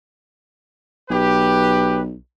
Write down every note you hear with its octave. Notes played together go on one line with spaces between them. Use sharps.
B1 G4 B4